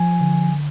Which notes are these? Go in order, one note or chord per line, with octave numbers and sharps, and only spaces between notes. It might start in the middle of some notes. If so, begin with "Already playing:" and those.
Already playing: F3 G#5
D3